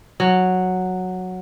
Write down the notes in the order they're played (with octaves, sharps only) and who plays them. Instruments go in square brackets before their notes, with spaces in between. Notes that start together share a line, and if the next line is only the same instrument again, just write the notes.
[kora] F#3